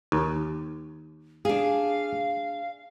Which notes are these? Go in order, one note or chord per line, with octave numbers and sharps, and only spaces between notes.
D#2
D4 G#4 F5